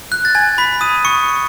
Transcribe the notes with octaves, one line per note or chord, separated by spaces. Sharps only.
F#6
A6
G#5 G#6
B5 B6
D#6 D#7
C#6 C#7